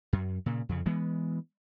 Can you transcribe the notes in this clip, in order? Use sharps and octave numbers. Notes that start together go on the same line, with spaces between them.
F#2
A#2 C#3
F2 C#3
E3 G#3 B3